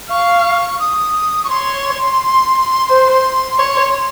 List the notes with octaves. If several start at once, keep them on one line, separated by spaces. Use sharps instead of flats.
F5 C#6
D#6
C#6
C#5 C6
C5
C#5